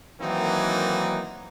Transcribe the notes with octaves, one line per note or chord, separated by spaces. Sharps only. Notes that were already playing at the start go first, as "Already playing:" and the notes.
D#3 E3 F#3 A#3 C4 D#4